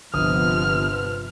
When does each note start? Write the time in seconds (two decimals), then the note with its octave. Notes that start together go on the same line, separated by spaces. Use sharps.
0.14 G1 C3 F3 B3 D#6 F6